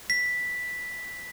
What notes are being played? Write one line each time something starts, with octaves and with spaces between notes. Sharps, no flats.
B6